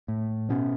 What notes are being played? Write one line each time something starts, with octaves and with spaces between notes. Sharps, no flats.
A2
B2 B3 C#4